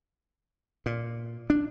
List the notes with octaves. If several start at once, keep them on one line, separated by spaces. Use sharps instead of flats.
A#2
D4